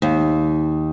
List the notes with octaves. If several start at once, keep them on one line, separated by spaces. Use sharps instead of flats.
D#2